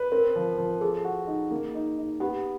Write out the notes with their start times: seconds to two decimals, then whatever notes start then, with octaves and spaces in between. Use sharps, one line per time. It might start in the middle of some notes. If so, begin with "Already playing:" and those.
Already playing: B4
0.12 C4 A#4
0.35 F3
0.58 F3
0.81 G#4 A4
1.05 F#4
1.27 D#4
1.51 A#3
1.75 D#4
1.98 D#4
2.20 B3 G4